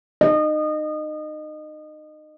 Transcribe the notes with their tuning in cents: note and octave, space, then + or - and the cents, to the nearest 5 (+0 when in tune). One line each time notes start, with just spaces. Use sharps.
D#5 -25